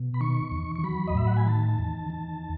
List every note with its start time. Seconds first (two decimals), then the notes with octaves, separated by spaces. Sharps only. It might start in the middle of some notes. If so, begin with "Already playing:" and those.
Already playing: B2
0.14 B5
0.21 D#3 C#6
0.52 E2
0.75 C#6
0.84 F#3 B5
1.08 D#5
1.15 A2 E5
1.27 F#5
1.37 G#5
1.46 D#3 A5
1.79 E2
2.10 D#3